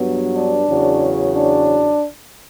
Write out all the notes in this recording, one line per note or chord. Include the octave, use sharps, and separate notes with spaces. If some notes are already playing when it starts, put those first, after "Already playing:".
Already playing: G2 F#3 B3
D4
E2 C#3 F#3
D4